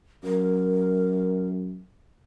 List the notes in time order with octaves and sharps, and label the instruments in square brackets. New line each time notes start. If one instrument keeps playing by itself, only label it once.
[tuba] F#2 [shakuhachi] A#4